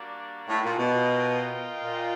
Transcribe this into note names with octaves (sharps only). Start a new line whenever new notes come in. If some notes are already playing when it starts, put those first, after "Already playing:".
Already playing: G3 A#3 D4 F#4
A2
A#2
B2
F4 A#4 D#5 G5
A#2